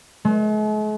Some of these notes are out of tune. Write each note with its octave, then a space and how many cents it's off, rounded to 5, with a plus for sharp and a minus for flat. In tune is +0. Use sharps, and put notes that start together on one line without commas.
G#3 +45